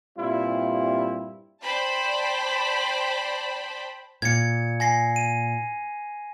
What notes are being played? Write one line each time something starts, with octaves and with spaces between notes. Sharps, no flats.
G2 A#2 G3 C4 E4 F4
C5 D5 G5 A5 B5
A#2 G#6 C#7
G#5 A#6 C7
D#7